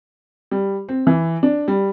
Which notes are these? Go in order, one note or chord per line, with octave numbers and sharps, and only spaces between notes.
G3
C4
E3
D4
G3